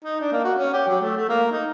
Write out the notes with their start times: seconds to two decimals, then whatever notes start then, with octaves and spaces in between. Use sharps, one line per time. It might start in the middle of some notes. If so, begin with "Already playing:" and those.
0.04 D#4
0.21 D4
0.32 A#3
0.44 F#4
0.58 C#4
0.73 G4
0.88 F#3
1.01 A3
1.17 A3
1.29 A#3
1.52 D#4